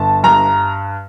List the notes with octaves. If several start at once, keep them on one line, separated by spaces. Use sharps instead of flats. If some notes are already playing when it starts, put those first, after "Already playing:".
Already playing: G1 A5
G2 A#5